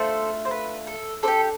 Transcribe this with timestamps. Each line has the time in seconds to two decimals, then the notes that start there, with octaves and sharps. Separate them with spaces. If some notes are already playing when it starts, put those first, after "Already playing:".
Already playing: A3 D4 F4 A4 C5
0.45 C5
0.51 B4
0.87 A4
1.23 D4 G4 A4 C5